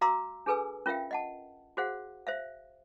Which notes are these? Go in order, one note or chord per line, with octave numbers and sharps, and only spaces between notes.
F#4 F5 A#5 C6 D6 E6
D4 G#4 A4 B4 G#5 E6
C#4 F4 A#4 E5 F5 G5
D#5 F#5 A5
F#4 G#4 C5 F5 F#5
C5 E5 F5